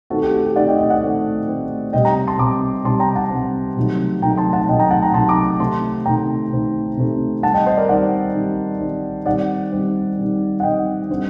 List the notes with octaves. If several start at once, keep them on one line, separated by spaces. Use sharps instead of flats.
D#3 A3 C4 F#4 A4
G4
F#4
G4
D#3 A3 C4 D5 F#5
D#5 G5
D#5 G5
D5 F#5
D#3 A3 C4
D#3 A3 C4
C3 G3 C4 D#5 G5
G5 A#5
A5 C6
C3 G3 C4 A#5 D6
C3 G3 C4 A5 C6
G5 A#5
F#5 A5
C3 G3 C4
C3 D#3 F#3 A3
C3 D#3 F#3 A3 G5 A#5
A5 C6
F#5 A5
C3 D#3 F#3 A3 D#5 G5
G5 A#5
F#5 A5
G5 A#5
C3 D#3 F#3 A3 A5 C6
A#5 D6
C3 D#3 A3 C4 A5 C6
C3 D#3 A3 C4 G5 A#5
C3 D#3 A3 C4
C3 D#3 A3 C4
D#3 G3 C4 F#5 A5
D#5 G5
C5 D#5
A#4 D5
D#3 G3 C4 D5 F#5
D#3 G3 C4
D#3 G3 C4
D#3 G3 C4 D5 F#5
D#3 G3 C4
D#3 G3 C4
F#5
D#3 G3 C4 D#5 G5
D3 G3 C4